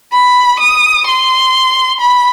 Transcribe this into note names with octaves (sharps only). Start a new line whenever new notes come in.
B5
D#6
C6
B5